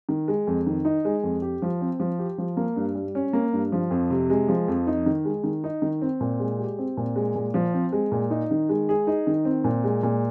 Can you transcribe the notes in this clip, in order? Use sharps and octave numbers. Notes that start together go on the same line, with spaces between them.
D#3
G#3
F2
D#3
D#4
G#3
F2
G4
F3
C4
F3
G4
F3
A#3
G2
G3
C#4
A#3
G2
F3
F2
C3
G#3
F3
F2
D#4
D#3
G#3
D#3
D#4
D#3
C4
A#2
G#3
G4
C4
A#2
G#3
A#2
F3
C4
G#3
A#2
D#4
D#3
G#3
G#4
D#4
D#3
C4
A#2
G#3
A#2